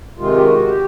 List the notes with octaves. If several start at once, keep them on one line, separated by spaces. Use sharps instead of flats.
C3 D#3 G#3 F4
G4
F#4
G4